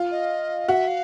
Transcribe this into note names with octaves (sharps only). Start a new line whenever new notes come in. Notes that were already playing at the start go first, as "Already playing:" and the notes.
Already playing: F4
D#5
F#4 E5
F5